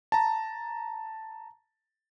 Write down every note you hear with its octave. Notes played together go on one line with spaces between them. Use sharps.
A5 A#5